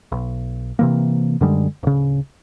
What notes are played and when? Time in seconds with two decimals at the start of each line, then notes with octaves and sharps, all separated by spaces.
0.12 B1
0.79 C3 E3 A#3
1.41 F#2 D3 G3 G#3
1.83 D1 C#3